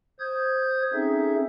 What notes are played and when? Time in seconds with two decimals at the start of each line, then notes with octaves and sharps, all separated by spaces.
0.20 C5 D#6 G6 G#6
0.93 C4 C#4 D#4 G#4 A4 E5